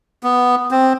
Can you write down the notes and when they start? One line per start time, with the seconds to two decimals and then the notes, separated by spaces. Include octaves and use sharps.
0.23 B3
0.71 C4